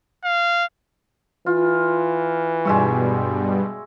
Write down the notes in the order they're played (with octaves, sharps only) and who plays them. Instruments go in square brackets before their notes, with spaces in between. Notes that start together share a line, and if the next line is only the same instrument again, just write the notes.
[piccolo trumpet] F5
[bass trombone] E3 [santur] F4
[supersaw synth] G2 B2 G3 [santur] G#3 E5 C#6